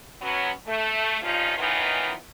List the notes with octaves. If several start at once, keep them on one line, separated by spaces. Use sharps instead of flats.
F#3 B3 C#4
A3
G2 F3 C#4 D#4 F4
D#3 E3 B3 C#4 D#4 F4